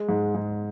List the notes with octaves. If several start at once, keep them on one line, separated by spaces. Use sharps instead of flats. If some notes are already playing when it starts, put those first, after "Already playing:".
Already playing: G#3
G#2
G#2